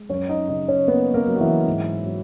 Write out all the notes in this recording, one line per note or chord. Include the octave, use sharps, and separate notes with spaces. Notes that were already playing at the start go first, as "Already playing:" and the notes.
Already playing: G#3
F#2 C#4 C#5
D#4 D#5
C#3 D#4 D#5
C#4 C#5
A#3 B3 B4
A#3 A#4
F#3
F#4
E3 E4
G#2
F#3